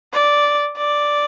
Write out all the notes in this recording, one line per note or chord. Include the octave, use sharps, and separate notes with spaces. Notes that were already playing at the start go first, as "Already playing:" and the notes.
D5
D5